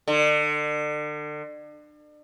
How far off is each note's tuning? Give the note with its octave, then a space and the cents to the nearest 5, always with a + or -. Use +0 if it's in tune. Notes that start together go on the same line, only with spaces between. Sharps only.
D3 +35